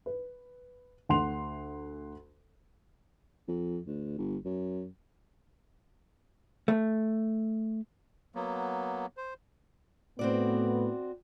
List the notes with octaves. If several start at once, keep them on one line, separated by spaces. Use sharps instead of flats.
B4
D2 F#5 C6 F7
F2
D2
G1
F#2
A3
F#3 A#3 B3
C5
A2 B3 C4 F#4 D5